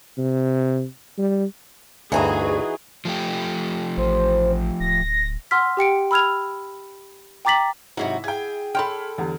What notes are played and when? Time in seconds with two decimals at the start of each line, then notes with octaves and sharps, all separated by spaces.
0.18 C3
1.19 G3
2.12 D2 G2 E3 D#4 F#4 G#4
3.05 F3 A3 G4
3.97 A1 C5
4.80 D1 A#6
5.51 F#5 C6 E6 F6 B6
5.77 G4 G5 C#7 D7
6.11 B5 E6 F6 G#6 F7
7.45 G5 A#5 D6 A6 B6 F#7
7.97 G#2 C3 F#3 D#4 E4 F#4
8.24 G#4 G5 G#6
8.75 A4 C#5 G5 B5 C6 F6
9.18 E2 D3 G3